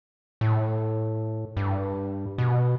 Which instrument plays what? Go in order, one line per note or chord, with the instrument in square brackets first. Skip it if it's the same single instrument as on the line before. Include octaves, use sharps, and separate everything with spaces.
[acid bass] A2
G2
B2